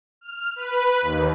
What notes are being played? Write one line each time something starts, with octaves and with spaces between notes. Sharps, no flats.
F6
B4
D#2